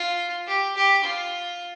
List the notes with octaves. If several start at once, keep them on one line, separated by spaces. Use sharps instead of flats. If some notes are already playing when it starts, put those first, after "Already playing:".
Already playing: F4
G4
G4
F4